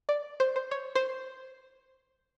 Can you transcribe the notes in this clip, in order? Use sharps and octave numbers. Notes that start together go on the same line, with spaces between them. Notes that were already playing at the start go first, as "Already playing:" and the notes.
D5
C5
C5
C#5
C5